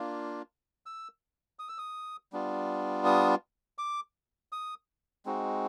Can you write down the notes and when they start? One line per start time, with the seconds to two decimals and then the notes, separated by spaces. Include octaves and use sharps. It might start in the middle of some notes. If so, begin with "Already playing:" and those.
Already playing: A#3 D4 F4
0.86 E6
1.59 D#6
1.69 E6
1.78 D#6
2.33 G3 B3 D4 F4
3.05 D#6
3.78 D6
4.52 D#6
5.26 G#3 C4 D#4 F#4